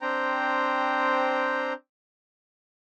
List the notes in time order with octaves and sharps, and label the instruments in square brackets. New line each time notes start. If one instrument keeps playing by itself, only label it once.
[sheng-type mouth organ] C4 D4 C5 G5 A#5